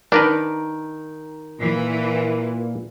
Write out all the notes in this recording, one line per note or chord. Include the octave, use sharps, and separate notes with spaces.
D#3 D4 A#4 B4
A#2 E3